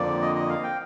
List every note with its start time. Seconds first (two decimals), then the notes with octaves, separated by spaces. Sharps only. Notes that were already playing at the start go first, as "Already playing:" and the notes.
Already playing: F2 D3 F3 A#3 D5
0.22 D#5
0.36 D#5
0.49 F5
0.63 G5